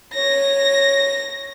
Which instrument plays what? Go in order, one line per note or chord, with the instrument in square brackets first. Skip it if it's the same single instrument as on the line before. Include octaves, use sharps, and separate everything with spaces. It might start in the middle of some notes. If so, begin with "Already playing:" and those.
[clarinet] C#5 [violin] A#6